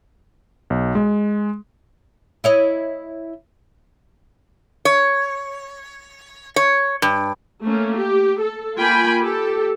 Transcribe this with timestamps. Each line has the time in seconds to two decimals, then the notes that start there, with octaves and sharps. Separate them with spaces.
0.70 B1
0.95 G#3
2.44 E4 C#5 D#5
4.85 C#5
6.56 C#5
7.02 G2
7.62 A3 A#3 C#4
7.96 G4
8.40 A4
8.77 A#3 F4 G5 G#5 B5
9.21 G4 A4